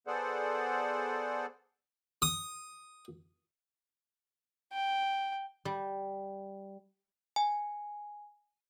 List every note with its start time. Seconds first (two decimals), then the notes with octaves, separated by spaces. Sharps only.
0.07 B3 G#4 A4 C5 D5 F#5
2.22 D#6
4.73 G5
5.65 G3
7.36 G#5